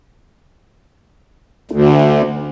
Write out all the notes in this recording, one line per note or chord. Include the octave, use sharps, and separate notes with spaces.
D2